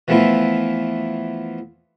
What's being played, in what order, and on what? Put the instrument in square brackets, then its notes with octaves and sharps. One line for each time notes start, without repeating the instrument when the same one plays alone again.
[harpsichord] E3 F3 A3 B3 E4 F4